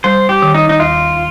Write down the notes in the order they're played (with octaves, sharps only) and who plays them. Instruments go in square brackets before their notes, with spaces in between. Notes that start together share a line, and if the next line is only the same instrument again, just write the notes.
[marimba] G3 [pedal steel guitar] C5
[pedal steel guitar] G4
[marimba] D#3
[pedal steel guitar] D#4
D#4
[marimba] D#2 [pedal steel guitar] F4